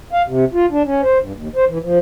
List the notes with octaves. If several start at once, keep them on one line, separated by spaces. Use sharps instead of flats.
F5
C3
F4
D4
C#4
C5
G2
D#2
C5
E3
F3